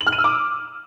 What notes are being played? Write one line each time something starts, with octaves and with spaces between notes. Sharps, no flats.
F#7
F6
D#7
E6
D6